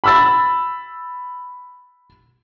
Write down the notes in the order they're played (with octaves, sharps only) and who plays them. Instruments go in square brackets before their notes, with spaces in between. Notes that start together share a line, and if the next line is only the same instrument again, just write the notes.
[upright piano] B5 E6 A6